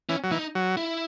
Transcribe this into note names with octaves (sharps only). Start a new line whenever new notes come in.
E3 C#4
F#3
E3 D#4
F#3
E4